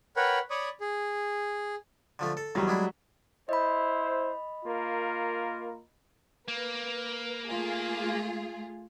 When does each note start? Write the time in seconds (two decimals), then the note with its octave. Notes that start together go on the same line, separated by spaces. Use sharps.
0.16 A#4 B4 C#5 F#5 G5 B5
0.50 C#5 D5 B5 C#6 D#6
0.81 G#4
2.19 D3 F3 A3
2.37 A4
2.55 E2 D#3 F#3 G3
2.68 G#3 D4 E4
3.49 E4 C5 D#5 B5
4.65 A#3 F4 A#4
6.48 A#3 B4
7.48 A3 F4 G#4